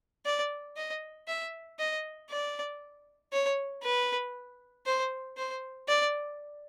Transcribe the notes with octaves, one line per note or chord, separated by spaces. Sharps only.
D5
D#5
E5
D#5
D5
C#5
B4
C5
C5
D5